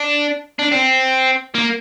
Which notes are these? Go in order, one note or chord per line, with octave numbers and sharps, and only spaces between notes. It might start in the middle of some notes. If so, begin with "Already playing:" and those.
Already playing: D4
D4
C4
A#3